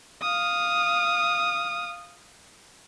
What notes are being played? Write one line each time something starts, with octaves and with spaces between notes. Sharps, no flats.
F5 D#6